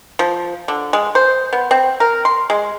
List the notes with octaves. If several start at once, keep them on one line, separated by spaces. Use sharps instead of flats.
F3
D3
G#3
C5
B3
C4
A#4
C6
G#3